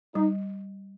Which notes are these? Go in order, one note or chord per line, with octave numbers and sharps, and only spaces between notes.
G3 D#4